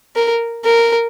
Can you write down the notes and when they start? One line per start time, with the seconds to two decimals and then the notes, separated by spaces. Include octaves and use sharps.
0.16 A#4
0.65 A#4